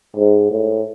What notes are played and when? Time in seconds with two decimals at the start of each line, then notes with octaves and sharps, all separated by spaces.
0.16 G#2
0.51 A2